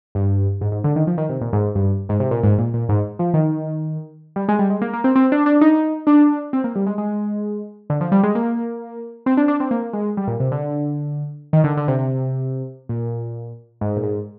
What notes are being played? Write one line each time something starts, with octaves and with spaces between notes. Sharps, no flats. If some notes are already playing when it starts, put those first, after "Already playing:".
G2
G#2
G#2
D3
D#3
F3
D#3
C3
A#2
G#2
G2
G#2
C3
A#2
G#2
A#2
A#2
G#2
F3
D#3
G3
G#3
G3
G#3
A#3
A#3
C4
C4
D4
D4
D#4
D4
C4
A#3
G3
G#3
G#3
D3
F3
G3
G#3
A#3
C4
D4
D4
C4
A#3
G#3
G3
A#2
C3
D3
D#3
D3
D3
C3
C3
A#2
G#2
A#2
G#2